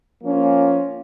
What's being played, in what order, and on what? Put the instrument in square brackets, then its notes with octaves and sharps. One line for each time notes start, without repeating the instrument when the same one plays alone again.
[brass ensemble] F3 A#3 C#4 F4